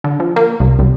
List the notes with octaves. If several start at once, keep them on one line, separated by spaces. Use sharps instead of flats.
D3
F3
A#3
C2
C2